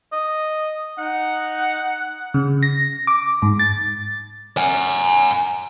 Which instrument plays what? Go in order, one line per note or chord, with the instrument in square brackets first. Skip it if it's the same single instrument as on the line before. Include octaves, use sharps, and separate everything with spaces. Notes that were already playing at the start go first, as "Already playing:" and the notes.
[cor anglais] D#5
[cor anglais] D#4 [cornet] F#5
[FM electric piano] C#3
A#6
D6
G#2
A6
[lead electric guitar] F#5 G#5